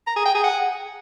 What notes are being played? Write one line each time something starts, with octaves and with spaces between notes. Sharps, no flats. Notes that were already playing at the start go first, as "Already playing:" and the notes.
A#5
G#4
G5
G#4
F#5